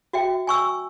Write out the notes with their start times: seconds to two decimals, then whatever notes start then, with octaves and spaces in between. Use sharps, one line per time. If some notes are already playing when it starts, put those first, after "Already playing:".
0.13 F#4 E5 G5
0.47 G#5 C#6 E6